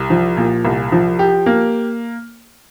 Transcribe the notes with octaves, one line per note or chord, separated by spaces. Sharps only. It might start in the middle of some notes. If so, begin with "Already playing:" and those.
Already playing: C2
F3
A#2
C2
F3
G4
A#3